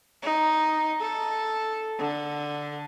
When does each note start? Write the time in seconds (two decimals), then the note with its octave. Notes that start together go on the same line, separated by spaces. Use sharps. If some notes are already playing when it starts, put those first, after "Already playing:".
0.23 D#4
1.00 A4
1.99 D3